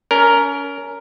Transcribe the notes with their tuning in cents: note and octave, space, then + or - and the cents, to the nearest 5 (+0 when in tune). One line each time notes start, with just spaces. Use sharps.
C#4 +30 A#4 +0